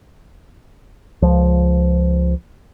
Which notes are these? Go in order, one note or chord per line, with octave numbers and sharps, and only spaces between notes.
C#2 F3